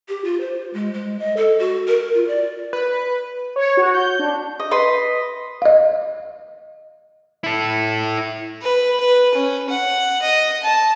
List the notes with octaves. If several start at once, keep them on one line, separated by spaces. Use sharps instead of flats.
G4
F4
C5
G#3
G#3
D#5
A4
F#4
A#4
F4
D5
B4
C#5
F#4
G6
D4
D#5
B4 D#5 C6
D#5 F5
E4 A4
B4
B4
C#4
F#5
D#5
A5